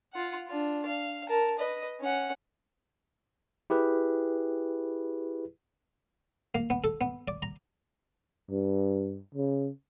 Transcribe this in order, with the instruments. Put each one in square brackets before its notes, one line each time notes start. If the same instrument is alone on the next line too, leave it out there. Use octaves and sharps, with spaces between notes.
[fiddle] F4 F#5
D4 F4
F5
A#4 A5
B4 D#5
C#4 F#5
[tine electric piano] E4 G4 G#4 B4
[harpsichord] A#3
B3
A4
B3
D5
A#5
[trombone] G2
C#3